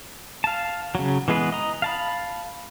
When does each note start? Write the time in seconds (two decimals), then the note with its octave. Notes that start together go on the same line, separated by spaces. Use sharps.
0.44 F5 A5
0.95 C#3 F#3
1.28 E3 G#3 B3 G#4 B4
1.52 D#5 A#5
1.82 F5 A5 B5